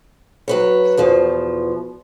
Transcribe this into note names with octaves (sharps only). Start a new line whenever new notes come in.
F#3 B4 C#5
E2 B2 F3